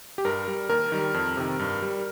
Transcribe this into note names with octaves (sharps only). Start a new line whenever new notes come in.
G4
G2 A#4
G3
D#2 A#4
D#3 G3
F2
C3 D#3
G2
G3